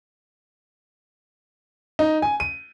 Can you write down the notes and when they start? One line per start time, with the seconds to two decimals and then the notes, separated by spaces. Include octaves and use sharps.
1.99 D#4
2.22 G#5
2.40 D#7